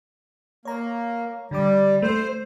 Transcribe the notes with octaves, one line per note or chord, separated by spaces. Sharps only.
A#3 C#5 A#5
D3 G3 D6
A3 C5